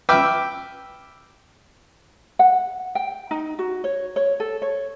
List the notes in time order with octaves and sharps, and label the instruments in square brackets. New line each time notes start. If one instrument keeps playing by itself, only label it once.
[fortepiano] B4 E5 G5 D6 E6 F6
[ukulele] F#5
G5
D#4
F#4
C#5
C#5
A4
C#5